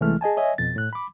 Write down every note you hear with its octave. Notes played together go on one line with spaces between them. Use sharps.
C2 E3 G#3 A3 F6
G#4 D#5 G#5 A5
C#5 D#5 E5 G#5
F2 B2 A6
A2 F#6
B5 D6